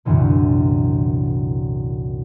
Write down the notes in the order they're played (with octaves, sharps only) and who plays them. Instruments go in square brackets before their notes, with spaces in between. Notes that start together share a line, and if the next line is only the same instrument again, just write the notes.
[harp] C2 F#2 A#2 D3 E3 A#3